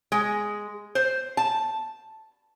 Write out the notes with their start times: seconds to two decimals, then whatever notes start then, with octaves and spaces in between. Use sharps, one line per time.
0.12 G#3
0.95 C5
1.37 A5